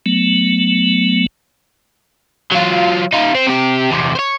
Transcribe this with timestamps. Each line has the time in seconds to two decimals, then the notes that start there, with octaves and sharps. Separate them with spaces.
0.06 F#3 A3 B3
2.52 F#3 F4
3.13 D#4 F4
3.35 C4
3.46 C3 G4
3.90 E2 C3
4.15 C5 C#5